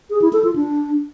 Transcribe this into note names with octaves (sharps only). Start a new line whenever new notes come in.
G#4
E4
A4
F4
D4